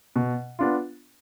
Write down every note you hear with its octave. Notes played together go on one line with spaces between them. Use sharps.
B2
B3 D4 F4